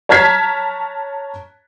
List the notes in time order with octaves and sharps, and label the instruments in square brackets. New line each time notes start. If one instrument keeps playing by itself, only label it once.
[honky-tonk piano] C#5 A5 A#5 F6 G#6 B6